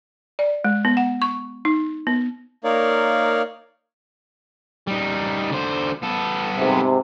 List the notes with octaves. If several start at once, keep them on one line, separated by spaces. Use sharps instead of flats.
D5
G#3
B3
F#5
C#6
D#4
B3
A#3 D#4 A#4 C#5 D5 F5
G3 D#4
D3 C5
B3 A4
G#2 C3